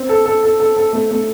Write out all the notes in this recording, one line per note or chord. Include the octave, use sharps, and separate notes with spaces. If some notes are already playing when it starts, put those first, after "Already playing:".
Already playing: C4
A4
A4
A4
A4
A4
A3
A3